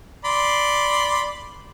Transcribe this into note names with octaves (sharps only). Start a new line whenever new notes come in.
D5 B5 C6